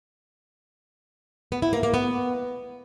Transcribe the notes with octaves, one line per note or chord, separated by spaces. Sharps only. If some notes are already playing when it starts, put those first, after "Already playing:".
B3
E4
A#3
A#3
B3